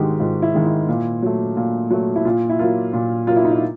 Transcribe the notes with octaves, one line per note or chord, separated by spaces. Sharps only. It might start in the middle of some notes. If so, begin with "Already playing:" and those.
Already playing: G#2 D#3 G#3 F#4 G4
G#2 F4
E4
D#3 G#3
E4
A#2
F#3 A3
A#2
F#3 A3
E4
A#2 F4
E4
F#3 A#3 F4
A#2
F#3 A#3 F4
E4
D#4
E4